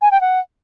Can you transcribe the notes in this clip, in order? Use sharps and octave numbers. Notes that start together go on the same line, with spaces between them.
G#5
G5
F#5